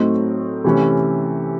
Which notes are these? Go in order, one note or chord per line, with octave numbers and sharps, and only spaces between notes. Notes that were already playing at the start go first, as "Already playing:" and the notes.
Already playing: A2 F#3 A3 C4 D#4
C3 E3 A3 C#4